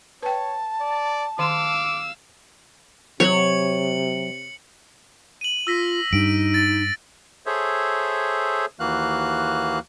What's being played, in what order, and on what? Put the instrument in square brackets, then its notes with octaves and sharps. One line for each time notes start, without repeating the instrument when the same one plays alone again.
[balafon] B4 G5 [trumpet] C#5 [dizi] A5
[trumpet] D5
[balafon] D#3 C6 [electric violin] F5 E6 [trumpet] D6
[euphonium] C3 [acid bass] F#3 [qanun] C#5 [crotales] C#7 F#7
[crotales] D#7 F#7
[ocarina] F4 [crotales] E6 A#6 B6
[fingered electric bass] G2 [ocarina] D#4 [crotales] D7
[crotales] A6
[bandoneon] G#4 A4 C5 C#5 E5
D#2 E3 A#3 F#4 F5 F#6